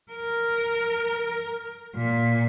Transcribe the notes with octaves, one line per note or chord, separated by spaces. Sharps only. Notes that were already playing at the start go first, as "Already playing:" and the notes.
A#4
A#2